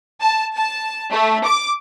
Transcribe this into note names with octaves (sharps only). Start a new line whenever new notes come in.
A5
A5
A3
D6